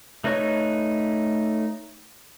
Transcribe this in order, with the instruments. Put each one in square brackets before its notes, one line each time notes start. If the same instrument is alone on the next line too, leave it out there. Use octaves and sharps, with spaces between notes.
[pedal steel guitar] A3 D#4 B4 C#5 C#6